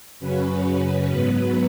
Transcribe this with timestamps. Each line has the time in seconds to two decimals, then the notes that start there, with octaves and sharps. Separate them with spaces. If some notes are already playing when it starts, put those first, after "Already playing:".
0.20 F#2 C#3 F#3 C#4 B4
1.10 G#2 F#3 B3